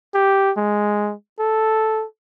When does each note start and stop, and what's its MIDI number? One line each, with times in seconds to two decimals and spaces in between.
0.14 0.52 67
0.57 1.14 56
1.39 2.05 69